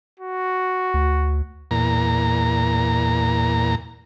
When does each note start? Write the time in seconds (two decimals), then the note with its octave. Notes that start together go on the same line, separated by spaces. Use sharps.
0.19 F#4
0.94 D2
1.71 E2 A#2 A#5